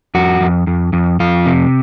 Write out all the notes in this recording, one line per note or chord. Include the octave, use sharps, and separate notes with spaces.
F2 F#4
F2
F2
F2
F2 F4
C3